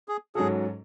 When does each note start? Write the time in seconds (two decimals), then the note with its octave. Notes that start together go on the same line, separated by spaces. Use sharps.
0.09 G#4
0.35 G#2 F#3 C#4 F#4 G#4 A4